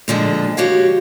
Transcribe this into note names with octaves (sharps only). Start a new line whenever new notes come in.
A#2 D3 F3 G#3
F#4 G4 C#5 F5